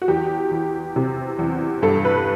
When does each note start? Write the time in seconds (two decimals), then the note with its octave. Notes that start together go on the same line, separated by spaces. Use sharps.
0.02 F#4
0.08 E2 G4
0.51 E3
0.96 C3
1.39 E2
1.82 G2 A4
2.05 B4